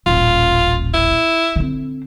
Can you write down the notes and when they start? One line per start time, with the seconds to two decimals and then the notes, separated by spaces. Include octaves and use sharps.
0.06 D#1 A1 F4
0.94 E4
1.56 D3 C4